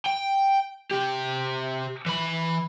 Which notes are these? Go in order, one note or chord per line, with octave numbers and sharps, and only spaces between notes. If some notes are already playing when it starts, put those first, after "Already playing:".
G5
C3 G4
E3 B5